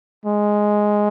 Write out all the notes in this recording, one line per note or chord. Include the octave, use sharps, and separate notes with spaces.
G#3